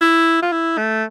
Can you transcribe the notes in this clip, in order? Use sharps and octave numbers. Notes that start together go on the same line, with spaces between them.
E4
F4
E4
A3